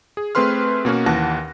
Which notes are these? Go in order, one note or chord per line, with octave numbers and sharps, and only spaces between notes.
G#4
A3 C4 G#4 B4 C6 F6
B2 A#3 C#4 F#4
D#2 E3 F#5 A5 F#6 A#6